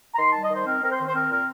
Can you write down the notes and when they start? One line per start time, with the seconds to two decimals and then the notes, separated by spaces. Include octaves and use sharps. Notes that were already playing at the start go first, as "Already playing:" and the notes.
0.14 A#5
0.18 D#3 C6
0.30 G3 A5
0.43 D#5
0.50 D#3 C5
0.66 C4 A#4
0.82 C4 A#4
0.90 C5
0.98 D#3
1.07 C5
1.14 C4 A#4
1.31 A#2 A#4